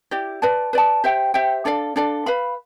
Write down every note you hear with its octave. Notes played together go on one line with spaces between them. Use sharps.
E4 G4 D5
B4 D5 A5
B4 D5 A5
G4 C5 E5 G5
G4 C5 E5 G5
D4 A4 D5 F5
D4 A4 D5 F5
B4 F5 B5